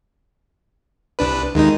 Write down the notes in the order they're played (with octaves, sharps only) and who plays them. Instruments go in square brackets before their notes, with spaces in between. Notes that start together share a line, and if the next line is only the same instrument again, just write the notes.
[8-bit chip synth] C2 D4 B4
[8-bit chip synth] D#2 G#3 D#4 [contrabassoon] D#3